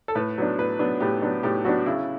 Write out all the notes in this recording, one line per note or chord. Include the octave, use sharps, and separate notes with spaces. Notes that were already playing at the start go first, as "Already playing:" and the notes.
A4
A2 B4
F#3 B3 D4
A2 B4
F#3 B3 D4
A2 G4
F#3 B3 D4
A2 G4
F#3 B3 D4 F#4
C#3 E4